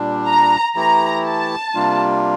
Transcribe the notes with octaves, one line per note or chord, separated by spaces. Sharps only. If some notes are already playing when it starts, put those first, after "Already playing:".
Already playing: A#2 G3 D4
A#5
E3 A3 E4 G4 A#5
A5
C3 G3 A#3 D4 F4